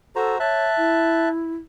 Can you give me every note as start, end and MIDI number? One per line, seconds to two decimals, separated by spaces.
0.16 0.38 66
0.16 0.36 69
0.16 0.38 72
0.16 0.38 82
0.40 0.66 73
0.40 1.29 76
0.40 1.29 81
0.40 1.29 90
0.77 1.55 64